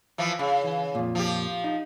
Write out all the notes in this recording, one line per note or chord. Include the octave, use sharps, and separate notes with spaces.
E3 F3
C#3
E3
F2 A#2
F3 G4
D#4